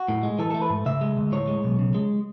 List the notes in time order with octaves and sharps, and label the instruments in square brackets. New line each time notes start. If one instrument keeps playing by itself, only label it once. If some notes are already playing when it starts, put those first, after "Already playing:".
Already playing: [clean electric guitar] F#4
A2
G#3
E3 A4
A4
A3
B4
G#2
C#3 E5
G#3
D2
A2 C#5
G#3
B1
C#3
G#3